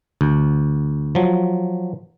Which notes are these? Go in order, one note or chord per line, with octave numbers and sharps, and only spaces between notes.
D2
F3 F#3